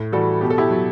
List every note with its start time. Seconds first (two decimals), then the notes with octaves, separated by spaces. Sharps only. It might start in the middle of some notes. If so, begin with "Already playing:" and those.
Already playing: A2
0.12 E3 G3 F#4 A4
0.41 B2 G4
0.50 A4
0.58 E4 G4
0.71 F#3